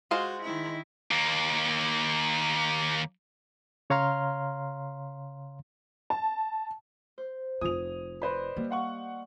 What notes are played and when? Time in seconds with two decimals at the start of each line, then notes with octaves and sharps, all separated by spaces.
0.11 G#3 F4 F#4 C5
0.43 D#3 E4
1.11 D#2 A#3
3.90 C#3 C#5 F5 A#5 C6 F6
6.10 A5
7.18 C5
7.61 F1 F4 G#5 D#6 F7
8.22 B4 C5 D5 D#5 B5
8.56 G3 A#3
8.70 F5 F#5 C6 C#6